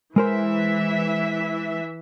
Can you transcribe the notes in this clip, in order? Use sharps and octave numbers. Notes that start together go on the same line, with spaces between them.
E3 G#3 A#4 C5 E5